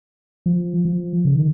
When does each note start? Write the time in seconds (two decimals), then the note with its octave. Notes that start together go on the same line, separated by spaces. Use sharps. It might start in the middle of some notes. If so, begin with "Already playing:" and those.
0.46 F3
0.85 F3
1.25 C#3
1.35 D#3